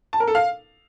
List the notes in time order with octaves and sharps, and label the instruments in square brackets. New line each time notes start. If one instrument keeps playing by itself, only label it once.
[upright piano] A5
A#4
A4
F5